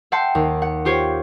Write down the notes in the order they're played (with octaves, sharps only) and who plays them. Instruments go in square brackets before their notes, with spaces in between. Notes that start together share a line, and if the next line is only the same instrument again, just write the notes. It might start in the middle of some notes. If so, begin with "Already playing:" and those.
[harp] E5 F#5 G5 A5 C6
D#2
F#5
F4 G4 C5 C#5